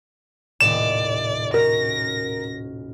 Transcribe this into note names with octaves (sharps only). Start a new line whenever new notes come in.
D#1 A2 C3 D5 E7
C#4 F#4 A#4 A#6